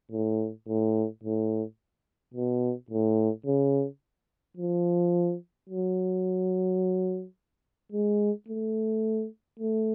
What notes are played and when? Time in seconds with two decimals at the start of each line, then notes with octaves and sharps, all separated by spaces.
0.12 A2
0.68 A2
1.24 A2
2.34 B2
2.91 A2
3.46 C#3
4.57 F3
5.69 F#3
7.92 G#3
8.49 A3
9.59 A3